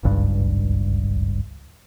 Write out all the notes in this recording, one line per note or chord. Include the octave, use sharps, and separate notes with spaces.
D1 G#1 C#2 G2